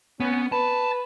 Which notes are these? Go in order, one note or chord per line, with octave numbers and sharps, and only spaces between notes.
B3 C#4
B4 A5